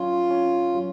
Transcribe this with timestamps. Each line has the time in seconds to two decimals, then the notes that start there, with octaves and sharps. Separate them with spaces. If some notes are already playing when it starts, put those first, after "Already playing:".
Already playing: F#3 C#4 F4
0.30 C#4
0.74 F#3